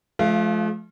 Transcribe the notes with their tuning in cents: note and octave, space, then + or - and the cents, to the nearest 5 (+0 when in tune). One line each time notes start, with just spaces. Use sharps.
F3 +0 A3 -45 F5 -20